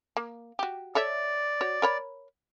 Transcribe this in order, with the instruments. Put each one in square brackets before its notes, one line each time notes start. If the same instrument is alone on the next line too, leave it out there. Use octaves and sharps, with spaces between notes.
[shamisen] A#3
F#4 G4
[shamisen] A4 C#5 E5 [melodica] D5
[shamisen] F#4 C#5
A#4 C#5 B5